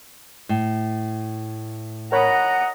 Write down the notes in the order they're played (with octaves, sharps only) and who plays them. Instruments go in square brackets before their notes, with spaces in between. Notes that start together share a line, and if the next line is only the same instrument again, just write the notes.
[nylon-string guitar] A2
[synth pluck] A#4 C#5 B5 [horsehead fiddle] D#5 A#5 [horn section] F#5